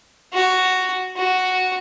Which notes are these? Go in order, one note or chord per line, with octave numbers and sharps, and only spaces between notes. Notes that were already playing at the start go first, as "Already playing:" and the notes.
F#4
F#4